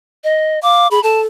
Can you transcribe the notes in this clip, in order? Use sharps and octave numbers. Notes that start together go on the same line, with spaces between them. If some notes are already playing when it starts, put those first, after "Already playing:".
D#5
F5 D6
G#4 B5
A4 A5